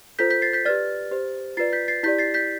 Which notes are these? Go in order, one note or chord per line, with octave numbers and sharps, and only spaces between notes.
F4 A4 C5 G6 B6
G6 B6
A6 C7
G6 B6
G4 B4 D5 F6 A6
G4 C5
F4 B4 D5 A6 C7
G6 B6
A6 C7
E4 G4 D5 G6 B6
A6 C7
G6 B6